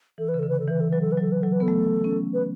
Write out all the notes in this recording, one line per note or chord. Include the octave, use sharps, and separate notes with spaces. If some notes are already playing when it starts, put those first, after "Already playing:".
E3 A4
B4
C#3
D3 A4
B4
A4
E3 B4
A4
F#3 B4
A4
B4
F#3 A4
B4
F#3 A4
B4
B3 A4
A3
C#4
B4